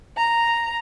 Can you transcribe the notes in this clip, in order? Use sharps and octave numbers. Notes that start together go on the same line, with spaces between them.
A#5